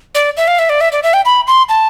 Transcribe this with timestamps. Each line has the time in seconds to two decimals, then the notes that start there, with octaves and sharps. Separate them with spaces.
0.15 D5
0.37 E5
0.48 F5
0.59 E5
0.69 D5
0.81 E5
0.92 D5
1.03 E5
1.14 G5
1.25 B5
1.47 C6
1.69 A5